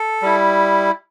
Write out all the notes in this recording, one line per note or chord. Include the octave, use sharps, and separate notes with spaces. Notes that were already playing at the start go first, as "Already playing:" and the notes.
Already playing: A4
G3 E4